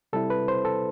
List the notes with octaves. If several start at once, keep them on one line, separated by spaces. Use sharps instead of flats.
C3 G3 C4 E4 A4
B4
C5
A4